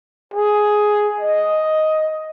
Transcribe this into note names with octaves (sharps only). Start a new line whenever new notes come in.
G#4
D#5